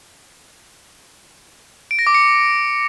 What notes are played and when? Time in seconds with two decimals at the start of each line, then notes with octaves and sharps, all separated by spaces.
1.91 D7
1.99 A#6
2.07 D6
2.14 C#7